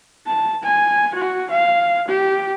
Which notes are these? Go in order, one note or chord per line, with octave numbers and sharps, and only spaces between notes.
A5
G#5
F#4
F5
G4